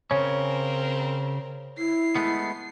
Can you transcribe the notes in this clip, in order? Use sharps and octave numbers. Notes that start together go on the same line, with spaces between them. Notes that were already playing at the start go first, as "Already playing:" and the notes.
C#3 C4 C#4 A#4 C#5
E4 C7
G#3 A3 B3